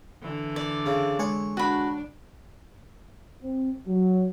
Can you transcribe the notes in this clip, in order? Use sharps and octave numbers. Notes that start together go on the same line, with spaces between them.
D3 E3
D5
C#3
G#3 C#5
D4 F#4 B5
C4
F#3